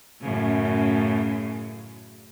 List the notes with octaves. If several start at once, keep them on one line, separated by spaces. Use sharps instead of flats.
F#2 A2 C#3